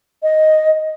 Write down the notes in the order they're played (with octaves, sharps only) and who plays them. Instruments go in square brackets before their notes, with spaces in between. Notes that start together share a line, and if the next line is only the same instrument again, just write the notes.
[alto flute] D#5